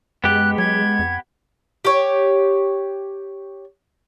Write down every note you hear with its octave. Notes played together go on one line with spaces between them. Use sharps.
F#2 G#3 B3 G4 F#6
F#3 G#6
F2
G4 C#5